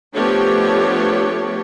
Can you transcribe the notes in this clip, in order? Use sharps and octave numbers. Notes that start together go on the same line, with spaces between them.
F3 A3 B3 D4 G4 C#5